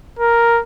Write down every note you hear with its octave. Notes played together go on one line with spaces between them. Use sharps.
A#4